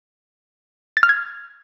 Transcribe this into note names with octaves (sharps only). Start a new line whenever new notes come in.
A6
F6
G#6